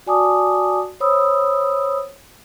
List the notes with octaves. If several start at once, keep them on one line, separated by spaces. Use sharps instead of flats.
F#4 D5 G#5 A5 D6 D#6
C5 C#5 B5 D#6 E6